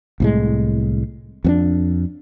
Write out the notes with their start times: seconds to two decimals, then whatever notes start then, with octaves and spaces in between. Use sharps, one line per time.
0.20 C2 A2 G#3
1.44 F2 B3 D4